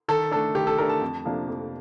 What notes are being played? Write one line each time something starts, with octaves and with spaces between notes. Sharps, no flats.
D#3 A4
A3 D4 A4
D#3 G4
A4
A3 D4 A#4
A5
F2
C3 F3 A#3 D4
F2